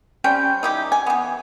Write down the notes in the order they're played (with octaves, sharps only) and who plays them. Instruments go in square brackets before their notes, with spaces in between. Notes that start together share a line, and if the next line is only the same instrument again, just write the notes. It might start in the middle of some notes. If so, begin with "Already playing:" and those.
[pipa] G3 C#4 C5 G5
D#4 E4 G4
G#5
E3 B3